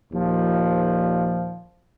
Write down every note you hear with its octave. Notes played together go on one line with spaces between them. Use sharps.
D#2 A#2 F3